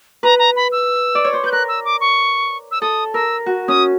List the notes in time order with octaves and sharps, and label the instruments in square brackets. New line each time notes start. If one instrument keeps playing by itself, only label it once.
[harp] B4 [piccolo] A#5
[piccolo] A#5
B5
E6
[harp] D5
C#5
C5
[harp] B4 [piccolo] G6
[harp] A#4 [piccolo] F#6
[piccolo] E6
D6
C#6
E6
[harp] A4 [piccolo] D#6
[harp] A#4 [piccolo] E6
[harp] F#4
[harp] C#4 [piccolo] D#6